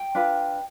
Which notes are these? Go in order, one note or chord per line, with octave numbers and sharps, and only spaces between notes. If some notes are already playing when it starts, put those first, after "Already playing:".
Already playing: G5
D4 F4 B4